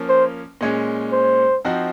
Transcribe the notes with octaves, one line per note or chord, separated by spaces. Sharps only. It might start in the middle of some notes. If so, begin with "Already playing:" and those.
Already playing: F3 A#3 C#4
C5
A#2 G#3 C#4
C5
F3 C4 D#4 F#4